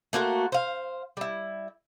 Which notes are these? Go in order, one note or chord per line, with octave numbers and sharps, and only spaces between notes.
A3 A#3 F#4 C5
C5 F5
G3 E4